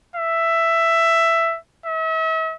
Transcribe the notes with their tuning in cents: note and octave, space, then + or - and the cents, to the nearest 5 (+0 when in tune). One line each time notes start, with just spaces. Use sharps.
E5 +10
E5 -40